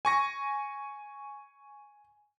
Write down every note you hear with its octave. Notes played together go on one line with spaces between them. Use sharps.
G#5 C#6 A#6